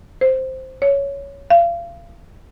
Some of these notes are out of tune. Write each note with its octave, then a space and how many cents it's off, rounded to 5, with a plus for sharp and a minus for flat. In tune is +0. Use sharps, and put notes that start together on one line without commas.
C5 +0
C#5 +10
F5 -35